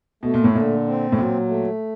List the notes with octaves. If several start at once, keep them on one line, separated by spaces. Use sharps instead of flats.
B2 A3
A#2
A2
A#2 D3
C4
A2
A#2 F#3
A3